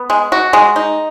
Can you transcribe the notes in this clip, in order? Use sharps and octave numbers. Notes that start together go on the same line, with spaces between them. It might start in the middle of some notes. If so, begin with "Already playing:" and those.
Already playing: B3
G#3
F#4
G#3
D#4